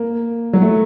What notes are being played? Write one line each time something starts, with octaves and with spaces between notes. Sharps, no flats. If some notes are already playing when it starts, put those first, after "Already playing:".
Already playing: A#3
F#3
A3